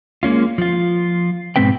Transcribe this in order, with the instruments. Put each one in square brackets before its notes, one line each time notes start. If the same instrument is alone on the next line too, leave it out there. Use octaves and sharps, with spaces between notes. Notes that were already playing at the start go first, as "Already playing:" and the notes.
[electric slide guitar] G#3 A#3 C#4 F4
F3 F4
G#2 B2 G#3 C4 B4 G5